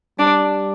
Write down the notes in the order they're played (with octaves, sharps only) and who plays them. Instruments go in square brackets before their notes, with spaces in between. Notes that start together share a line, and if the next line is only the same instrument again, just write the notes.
[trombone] G3 [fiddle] D4